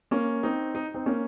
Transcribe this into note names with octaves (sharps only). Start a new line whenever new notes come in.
A#3 C#4
C4 D#4
D#4
C4 D#4
A#3 C#4